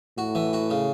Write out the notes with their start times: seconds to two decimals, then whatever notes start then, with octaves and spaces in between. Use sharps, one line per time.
0.18 A2 F#4
0.35 E3
0.53 F#4
0.70 C#3